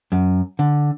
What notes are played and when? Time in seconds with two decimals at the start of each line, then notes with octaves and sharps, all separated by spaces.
0.12 F#2
0.59 D3